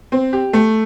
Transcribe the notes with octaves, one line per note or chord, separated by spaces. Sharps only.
C4
G4
A3